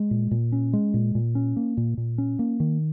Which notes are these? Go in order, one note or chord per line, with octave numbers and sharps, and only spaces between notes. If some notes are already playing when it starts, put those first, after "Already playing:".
Already playing: G#3
A#2
A#2
C#4
G#3
A#2
A#2
C#4
A#3
A#2
A#2
C#4
A#3
D#3